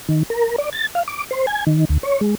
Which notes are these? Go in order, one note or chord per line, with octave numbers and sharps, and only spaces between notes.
D#3
A#4
D5
A6
F5
D6
C5
G#5
D#3
D2
C#5
G#3